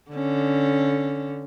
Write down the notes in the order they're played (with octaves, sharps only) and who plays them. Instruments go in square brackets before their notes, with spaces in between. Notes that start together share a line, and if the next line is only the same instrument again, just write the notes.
[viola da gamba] D3 C#4